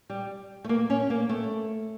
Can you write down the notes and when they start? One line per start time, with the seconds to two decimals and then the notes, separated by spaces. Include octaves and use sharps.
0.10 G3
0.64 A3
0.69 A#3
0.90 C#4
1.10 A#3
1.29 A3